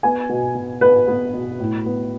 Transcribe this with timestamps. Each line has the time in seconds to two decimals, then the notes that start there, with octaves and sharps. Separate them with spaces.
0.03 B3 G#5
0.29 B2
0.55 B2
0.81 B3 B4
1.08 B3
1.34 B2
1.60 A2
1.85 B3